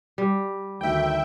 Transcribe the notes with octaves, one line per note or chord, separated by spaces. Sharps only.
G3
D2 D#3 E5 G5